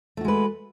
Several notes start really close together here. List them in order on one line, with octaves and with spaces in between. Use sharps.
A3 F#4 G#3 B4